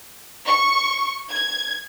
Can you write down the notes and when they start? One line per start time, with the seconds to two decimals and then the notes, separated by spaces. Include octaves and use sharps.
0.47 C#6
1.31 G#6